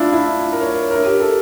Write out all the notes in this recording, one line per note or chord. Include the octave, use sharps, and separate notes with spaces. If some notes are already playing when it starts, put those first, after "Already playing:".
Already playing: D4 E4 F4
E4
A#4
C#5
A#4
G4
A4